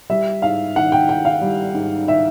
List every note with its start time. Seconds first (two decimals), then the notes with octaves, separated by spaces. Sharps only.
0.10 G3 E5
0.42 G#2 F5
0.76 D#3 F#5
0.92 G5
1.09 G#2 G5
1.25 F5
1.42 G3
1.74 G#2
2.07 D#3 E5